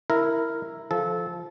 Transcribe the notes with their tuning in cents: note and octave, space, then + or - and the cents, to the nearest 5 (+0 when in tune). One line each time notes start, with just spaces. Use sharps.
E4 +0 A#4 -5
F3 +0 A4 -20